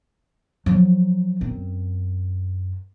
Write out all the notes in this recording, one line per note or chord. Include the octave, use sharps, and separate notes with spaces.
F3 F#3
F#2 C4